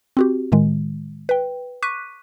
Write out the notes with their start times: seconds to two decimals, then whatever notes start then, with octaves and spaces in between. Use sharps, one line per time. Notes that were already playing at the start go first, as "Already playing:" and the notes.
0.17 C4 F#4 G4
0.52 A2 D#3 G#3
1.29 B4 G5
1.83 C#6 D6 F#6 B6 D#7